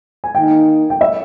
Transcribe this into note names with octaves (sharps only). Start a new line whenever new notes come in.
G#5
D#3 A#3 D#4 G5
G5
E5